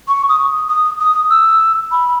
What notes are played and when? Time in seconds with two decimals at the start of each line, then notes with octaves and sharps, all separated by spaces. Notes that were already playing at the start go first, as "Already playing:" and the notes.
0.08 C#6
0.29 D#6
0.69 D#6
1.00 D#6
1.30 E6
1.92 B5